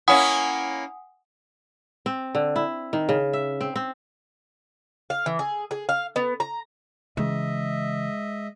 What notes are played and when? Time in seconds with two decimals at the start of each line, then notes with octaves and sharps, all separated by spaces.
0.08 A#3 C#4 E4 F#5 G#5 D#6
2.06 C4
2.35 D3
2.56 E4
2.93 D#3
3.09 C#3
3.33 E5
3.61 C4
3.76 C4
5.10 F5
5.26 E3
5.39 G#4
5.71 G#4
5.89 F5
6.16 B3
6.40 A#5
7.17 C#3 E3 G#3 D#5 E5